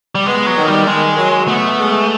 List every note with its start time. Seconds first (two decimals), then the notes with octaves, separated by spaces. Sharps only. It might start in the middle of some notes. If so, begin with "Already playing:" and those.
0.15 G3
0.26 G#3 B3
0.46 F#3
0.57 D#3
0.67 G3
0.87 D#3 G#3
1.18 F#3
1.48 A3 B3
1.79 G#3